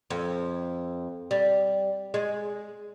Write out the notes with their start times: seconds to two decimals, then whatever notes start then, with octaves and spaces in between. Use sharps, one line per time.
0.10 F2
1.31 G3
2.14 G#3